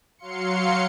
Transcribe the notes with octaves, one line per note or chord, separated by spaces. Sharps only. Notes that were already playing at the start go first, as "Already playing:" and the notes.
F#3 F5 C6 C#7